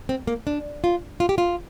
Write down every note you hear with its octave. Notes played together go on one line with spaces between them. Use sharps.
C4
A#3
D4
F4
F4
G4
F4